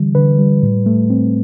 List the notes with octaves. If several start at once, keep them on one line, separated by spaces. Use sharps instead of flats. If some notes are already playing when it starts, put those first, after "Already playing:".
Already playing: D3 E3 G3
D3 B4
G3
A2
A3
C4